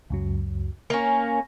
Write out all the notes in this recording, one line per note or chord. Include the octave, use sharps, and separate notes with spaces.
C#2 F#2 F#3
A#3 C#4 A#4